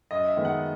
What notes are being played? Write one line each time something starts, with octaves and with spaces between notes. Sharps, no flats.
F#2 D#5
E5
D#3 G#3 B3
F#5